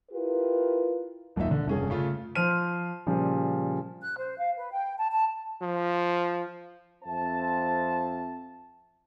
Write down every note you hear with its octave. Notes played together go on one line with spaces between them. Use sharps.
E4 F4 G4 A#4 B4
D#1 F#2 A#2 D#4 E5
D3
F1 G2 C#4 G#4
C#3 A3 F4
F3 C5 F6 D#7
A#2 C#3 F3 G3
F#6
C5
F5
B4
G5
A5
A5
F3
F2 C4 C5 E5 A5